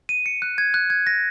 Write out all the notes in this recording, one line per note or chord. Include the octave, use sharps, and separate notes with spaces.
D#7
C#7
F#6
G#6
F#6
G#6
A#6